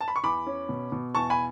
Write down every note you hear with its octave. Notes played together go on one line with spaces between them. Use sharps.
A5
B5
C#6
E2 B5 D6
C#4
B2
B2
E2 A5 C#6
G#5 B5